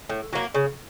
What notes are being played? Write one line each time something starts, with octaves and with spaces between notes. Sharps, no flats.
A2
F#3 A#3
C#3